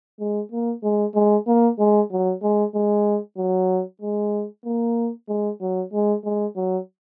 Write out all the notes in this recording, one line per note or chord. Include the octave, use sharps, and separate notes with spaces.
G#3
A#3
G#3
G#3
A#3
G#3
F#3
G#3
G#3
F#3
G#3
A#3
G#3
F#3
G#3
G#3
F#3